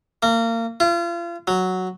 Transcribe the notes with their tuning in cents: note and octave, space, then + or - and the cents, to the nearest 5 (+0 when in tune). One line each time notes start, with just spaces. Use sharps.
A#3 -30
F4 -35
F#3 +0